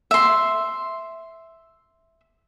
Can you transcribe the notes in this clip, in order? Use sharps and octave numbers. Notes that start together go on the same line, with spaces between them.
E5 C6